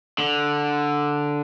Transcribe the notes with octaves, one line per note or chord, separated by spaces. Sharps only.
D3